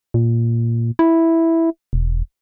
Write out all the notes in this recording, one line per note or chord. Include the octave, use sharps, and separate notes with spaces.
A#2
E4
E1